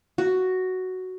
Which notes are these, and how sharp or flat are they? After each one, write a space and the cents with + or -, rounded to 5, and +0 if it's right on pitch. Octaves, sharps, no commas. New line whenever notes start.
F#4 +5